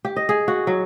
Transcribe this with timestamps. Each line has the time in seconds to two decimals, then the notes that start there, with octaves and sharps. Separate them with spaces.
0.05 G4
0.17 D#5
0.29 G#4
0.48 F#4
0.67 F#3